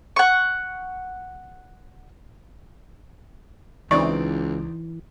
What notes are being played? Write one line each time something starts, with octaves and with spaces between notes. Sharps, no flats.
F#5 C#6
C#2 E3 C4 D#4 D5 C#6